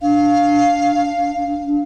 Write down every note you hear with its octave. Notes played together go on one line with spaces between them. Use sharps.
D4 F5